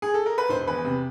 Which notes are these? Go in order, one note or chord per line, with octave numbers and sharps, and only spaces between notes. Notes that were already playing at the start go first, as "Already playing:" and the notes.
G#4
A4
A#4
B4
E1 C5
E2 B4
C3